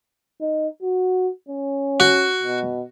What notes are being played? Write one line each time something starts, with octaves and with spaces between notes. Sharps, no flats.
D#4
F#4
C#4
F#4
B2